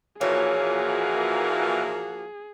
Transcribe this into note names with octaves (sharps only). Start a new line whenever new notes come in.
A#2 E3 F3 A#3 F#4 G#4 A#4 C#5